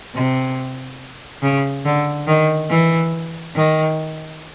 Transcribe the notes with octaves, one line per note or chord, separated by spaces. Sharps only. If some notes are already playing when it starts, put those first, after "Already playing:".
C3
C#3
D3
D#3
E3
D#3